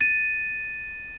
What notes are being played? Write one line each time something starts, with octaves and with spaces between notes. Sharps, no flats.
A6 D#7